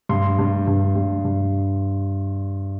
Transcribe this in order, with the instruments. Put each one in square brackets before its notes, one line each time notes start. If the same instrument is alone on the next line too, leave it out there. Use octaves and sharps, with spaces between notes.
[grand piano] G2 C6
G2
G2
G2
G2